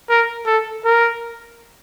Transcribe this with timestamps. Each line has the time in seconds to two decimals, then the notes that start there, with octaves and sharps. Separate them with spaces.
0.09 A#4
0.46 A4
0.85 A#4